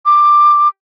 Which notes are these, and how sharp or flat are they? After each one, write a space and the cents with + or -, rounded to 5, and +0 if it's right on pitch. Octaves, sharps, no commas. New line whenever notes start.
D6 +10